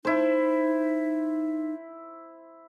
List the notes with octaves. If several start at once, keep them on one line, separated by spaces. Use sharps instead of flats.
D#4 E4 C5